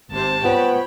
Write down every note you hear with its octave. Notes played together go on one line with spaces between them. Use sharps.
G#1 C3 C5 A5
B3 F4 C5 C#5 G5 B5